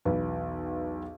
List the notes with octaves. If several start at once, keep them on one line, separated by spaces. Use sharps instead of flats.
B1 E2 B4